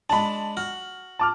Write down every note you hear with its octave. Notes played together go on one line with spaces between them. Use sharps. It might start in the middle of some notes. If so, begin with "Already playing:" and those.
G#3 D4 A5 B5
F#4 F6
A5 D6 F6